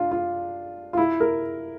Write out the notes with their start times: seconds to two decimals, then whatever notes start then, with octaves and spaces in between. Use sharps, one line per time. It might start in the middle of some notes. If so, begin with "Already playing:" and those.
Already playing: D4 F4
0.11 F4
0.93 F4
0.97 E4
1.21 A#4